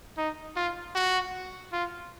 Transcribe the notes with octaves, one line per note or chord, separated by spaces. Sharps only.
D#4
F4
F#4
F4